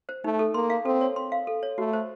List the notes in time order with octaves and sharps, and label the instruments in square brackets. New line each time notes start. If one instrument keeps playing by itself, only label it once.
[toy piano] C5
[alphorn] A3 [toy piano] D#4
[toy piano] A4
[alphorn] A#3 [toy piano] C6
[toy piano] F5
[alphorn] C4 [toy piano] A4
[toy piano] C#5
C6
F5
A4
C#5
[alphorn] A3 [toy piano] F#4
[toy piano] C5